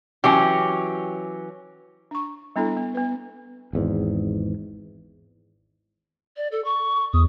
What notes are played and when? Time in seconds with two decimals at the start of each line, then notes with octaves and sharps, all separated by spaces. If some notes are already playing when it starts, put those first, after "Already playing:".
0.24 E3 F#3 C#4 G4
2.11 D4 C#6
2.56 G3 B3 D4 E4 A4
2.77 B3
2.94 B3 B4
3.73 G#1 E2 G#2
6.37 D5
6.52 A4
6.65 C#6
7.13 E2 D#6